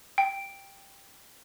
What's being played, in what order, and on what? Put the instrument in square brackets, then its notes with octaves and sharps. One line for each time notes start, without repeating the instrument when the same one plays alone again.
[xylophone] G5